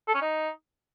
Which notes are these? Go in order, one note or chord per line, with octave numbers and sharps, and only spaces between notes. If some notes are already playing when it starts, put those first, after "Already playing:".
A4
C#4
D#4